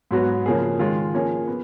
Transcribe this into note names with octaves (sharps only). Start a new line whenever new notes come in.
G#2 F#3 B3 F#4
C#3 F3 A#3 C#4 G#4
D#3 G#3 C#4 F4
F3 A#3 C#4 G#4
B3